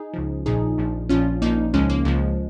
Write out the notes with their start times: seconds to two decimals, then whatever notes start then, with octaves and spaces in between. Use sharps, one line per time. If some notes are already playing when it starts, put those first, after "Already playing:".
Already playing: D#4 G#4
0.14 C#2 C#3 F3
0.46 A#1 A#2 F3 D#4 G#4
0.78 A#1 A#2 F3
1.09 A#1 A#2 F3 C#4 F4
1.42 A#1 A#2 F3 A#3 D#4
1.74 C#2 C#3 F3 G#3 C#4
1.90 A#3
2.05 C#2 C#3 F3 G#3